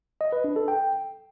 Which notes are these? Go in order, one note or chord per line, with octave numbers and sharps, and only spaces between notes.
D#5
B4
D4
A4
G5